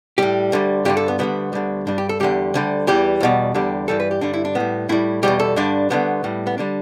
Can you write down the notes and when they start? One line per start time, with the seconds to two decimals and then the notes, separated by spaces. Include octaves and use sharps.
0.18 A2 G3 G4
0.52 D2 D3 G3
0.85 G2 D3 G3 G4
0.97 A4
1.08 B3
1.19 D2 D3 G3 B3
1.53 D2 D3 G3
1.87 G2 G3 D4
1.98 G4
2.09 A4
2.20 E2 D3 G3 G4
2.54 D2 D3 G3
2.87 E2 E3 G3 G4
3.20 E2 B2 G3
3.54 E2 D3 G3 G4
3.88 G2 E3 G3 A4
4.00 B4
4.11 G4
4.21 G2 D3 G3 D4
4.33 E4
4.45 D4
4.55 A2 G3 B3
4.89 A2 G3 E4
5.23 E2 B2 G3 G4
5.40 A4
5.56 G2 D3 G3 D4
5.90 D2 D3 G3 B3
6.24 A2 G3
6.47 B3
6.58 D3 G3 D4